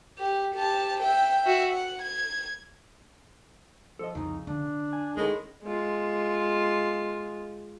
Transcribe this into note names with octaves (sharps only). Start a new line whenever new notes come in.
G4
G4 A5
E5 G5
F#4 E5
F#5
G#6
F3 A4 D#5
C2 F2 C#3 D#4
D3 D4
G#5
A2 D#3 G#3 C#4
G#3 F4